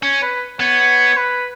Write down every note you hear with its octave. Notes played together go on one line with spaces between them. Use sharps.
C#4 C#5
B4
B3 C#5
B4